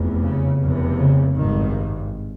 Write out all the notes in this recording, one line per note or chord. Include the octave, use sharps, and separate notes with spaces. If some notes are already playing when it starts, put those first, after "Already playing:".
Already playing: F1 E2
C#3
F1 E2 C3
C#3
G#1 G2 D#3